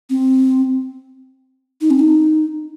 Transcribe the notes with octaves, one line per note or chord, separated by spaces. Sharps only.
C4
D#4
C4
D#4